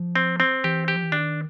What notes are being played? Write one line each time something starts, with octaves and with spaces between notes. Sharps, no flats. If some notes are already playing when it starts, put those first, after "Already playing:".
Already playing: F3
C4
C4
E3 G4
G4
F3
E3
D#3 D4